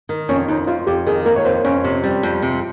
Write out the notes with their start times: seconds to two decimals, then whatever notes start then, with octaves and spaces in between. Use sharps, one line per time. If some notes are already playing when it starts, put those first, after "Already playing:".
0.09 D#3
0.29 F2 C#4
0.48 F2 D#4
0.67 F2 F4
0.87 F2 G4
1.07 D#3 G#4
1.26 A#3 A#4
1.36 C#5
1.45 F2 C5
1.64 F2 C#4
1.84 C3
2.04 G3
2.23 F2
2.42 C3